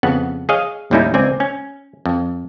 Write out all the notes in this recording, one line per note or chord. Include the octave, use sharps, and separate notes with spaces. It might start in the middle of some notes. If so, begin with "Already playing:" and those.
F2 C#3 B3 F#5
G#4 C#5 D#5 F5
D#2 A2 G3 C#4 D#4 E4
C#2 C4 D5 G#5
C#4
F2